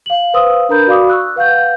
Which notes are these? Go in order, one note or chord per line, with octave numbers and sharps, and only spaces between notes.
F5 F#7
B4 C5 F5 C6 D#6 E6
D4 A#4 B4 A#5 B5 G6
F#4 D5 F5 B5 D6 D#6
C#6 E6 F#6
B4 F5 F#5 G6